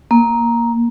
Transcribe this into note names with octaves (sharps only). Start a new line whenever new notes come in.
A#3